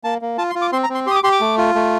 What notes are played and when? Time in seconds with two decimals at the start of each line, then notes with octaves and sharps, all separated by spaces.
0.04 A#3 A5
0.22 A#3
0.38 F4 A5
0.50 C6
0.55 F4
0.62 D6
0.72 C4 C6
0.84 A#5
0.89 C4
0.95 C6
1.06 G4 C6
1.11 D#6
1.16 D6
1.24 G4 C6
1.32 D6
1.41 A3
1.58 F4
1.75 A3